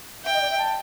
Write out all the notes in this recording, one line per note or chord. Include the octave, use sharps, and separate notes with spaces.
E5 G5
D#5
D5
E5
A5